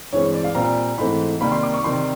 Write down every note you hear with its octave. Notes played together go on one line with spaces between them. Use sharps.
G2 E3 G#3 C4 C#5
D5
F5
A#2 G3 C4 A#5
G#2 E3 A3 C4 B5
C3 D#3 G3 A#3 B5
C6
D6
C#6
C3 D#3 G3 C6